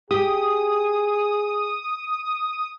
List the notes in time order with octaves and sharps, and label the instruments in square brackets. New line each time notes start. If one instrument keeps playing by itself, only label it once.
[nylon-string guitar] G4 [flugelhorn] G#4 [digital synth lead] D#6